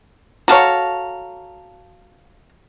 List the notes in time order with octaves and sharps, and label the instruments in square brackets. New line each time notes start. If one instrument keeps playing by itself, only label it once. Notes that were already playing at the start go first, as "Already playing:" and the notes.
[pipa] F#4 A4 C#5 [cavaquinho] F5 A5 A#5